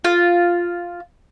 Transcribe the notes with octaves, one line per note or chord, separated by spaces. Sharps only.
F4